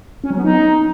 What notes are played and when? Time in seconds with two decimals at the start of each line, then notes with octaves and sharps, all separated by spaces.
0.24 C#4
0.30 F#3
0.37 B3
0.44 D#4